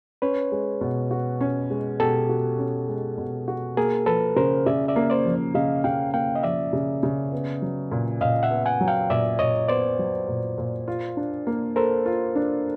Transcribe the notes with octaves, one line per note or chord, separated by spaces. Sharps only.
C#4 B4 C#5
G#3
B2
F#4
C#4
G#3
B2 G4 A4
F#4
C#4
G#3
B2
F#4
A#3 G#4 A#4
F3 A4 B4
C#3 A#4 C5
C#3 D5 E5
D5 E5
A#3
C5 D5
F3
C#3 D#5 F5
C#3 F5 G5
A#3 F5 G5
D#5
F3 D5 E5
C#3
C#3
B3
F#3
A#2
A#2 D#5 F5
E5 F#5
B3
F#5 G#5
F#3
F5 G5
A#2 D5 E5
A#2 C#5 D#5
B3 C5 D5
F#3
A#2
A#2
F4
D4
A#3
A4 A#4 C5
F4
D4